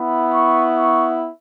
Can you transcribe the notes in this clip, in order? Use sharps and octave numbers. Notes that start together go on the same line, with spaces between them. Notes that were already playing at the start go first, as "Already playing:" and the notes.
Already playing: B3 E4
C#6
C#6